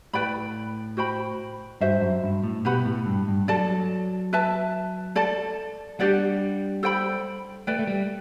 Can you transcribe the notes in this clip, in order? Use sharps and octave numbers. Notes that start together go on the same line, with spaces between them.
A2 B4 D5 G5 B5
F#4 C5 G5 B5
G2 F#4 C5 E5
F#2
G2
A2
B2 G4 B4 F#5 B5
A2
G2
G2
F#3 A4 D5 A5
B4 E5 A5
A4 D5 A5
G3 D4 G4 D5 F#5
A4 C5 G5 B5
A3 B4 D5 G5
A3
G3